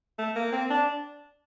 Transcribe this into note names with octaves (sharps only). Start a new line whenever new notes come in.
A3
A#3
C4
D4